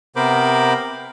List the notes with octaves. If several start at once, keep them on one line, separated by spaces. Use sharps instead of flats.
C3 B3 A#4 C5 B5 D6